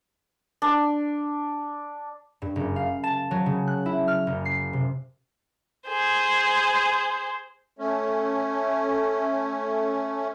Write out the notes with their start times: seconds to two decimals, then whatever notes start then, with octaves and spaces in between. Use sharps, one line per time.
0.62 D4
2.42 G2
2.56 F#1
2.76 F5
3.04 A5
3.31 F#3
3.46 C#3
3.68 F#6
3.86 E4
4.08 F6
4.27 F#1
4.45 C7
4.73 C3
5.88 G#4 C5
7.79 A3 C#4